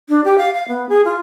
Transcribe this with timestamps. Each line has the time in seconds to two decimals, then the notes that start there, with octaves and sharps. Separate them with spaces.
0.09 D4
0.24 G4
0.38 F5
0.54 F5
0.69 B3
0.89 G#4
1.05 F4